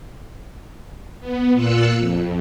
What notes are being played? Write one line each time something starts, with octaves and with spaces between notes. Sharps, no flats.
B3
A#2 F4 E6 F#6 C#7
F2